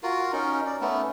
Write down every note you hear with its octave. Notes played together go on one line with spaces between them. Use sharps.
F4 F#4 A#4
C#4 D#4 A#4
D5
A3 B3 C#4